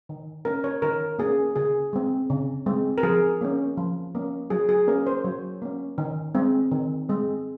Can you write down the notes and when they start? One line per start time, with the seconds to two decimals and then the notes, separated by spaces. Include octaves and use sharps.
0.09 D#3
0.45 A#3 C#4 A#4
0.64 C#5
0.82 D#3 A#4
1.19 A#3 C#4 G#4
1.56 C#3 G#4
1.93 G#3 C4
2.30 C#3
2.66 G#3 C4
2.98 A#4
3.03 F3 G#4
3.41 A#3 C#4
3.77 F3
4.15 A#3 C#4
4.50 F#3 G#4
4.69 G#4
4.87 A#3 C#4 A#4
5.07 C5
5.24 F#3 C#5
5.62 A#3 C#4
5.98 D#3
6.35 G#3 C4
6.71 D#3
7.09 G#3 C4